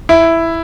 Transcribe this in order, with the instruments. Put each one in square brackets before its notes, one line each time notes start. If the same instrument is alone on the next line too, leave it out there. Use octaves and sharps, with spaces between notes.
[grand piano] E4